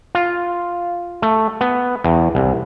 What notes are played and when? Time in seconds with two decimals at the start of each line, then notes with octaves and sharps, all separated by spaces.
0.15 F4
1.22 A3
1.61 B3
2.04 E2
2.35 C2